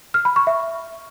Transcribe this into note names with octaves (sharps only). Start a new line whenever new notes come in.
F6
B5
C#6
E5